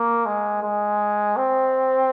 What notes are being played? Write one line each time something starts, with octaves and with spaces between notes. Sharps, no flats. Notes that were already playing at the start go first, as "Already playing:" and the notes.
Already playing: A#3
G#3
G#3
C4